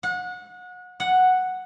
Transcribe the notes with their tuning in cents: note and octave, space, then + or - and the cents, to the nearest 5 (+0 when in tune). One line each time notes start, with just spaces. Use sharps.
F#5 -30
F#5 +0